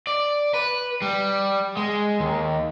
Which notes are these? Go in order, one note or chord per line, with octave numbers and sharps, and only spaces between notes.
D5
B4
G3
G#3
D#2